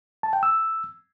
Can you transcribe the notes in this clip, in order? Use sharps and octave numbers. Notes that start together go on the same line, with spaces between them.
A5
G5
E6